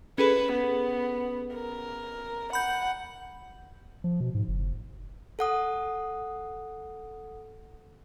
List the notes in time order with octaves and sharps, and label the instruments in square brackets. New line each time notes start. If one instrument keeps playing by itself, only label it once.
[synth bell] C#4 G#4 A4 [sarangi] B4
[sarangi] B3
A#4
[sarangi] F#5 [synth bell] B5 G6
[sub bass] F3
B2
G#2
F#1
[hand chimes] A4 F#5 D#6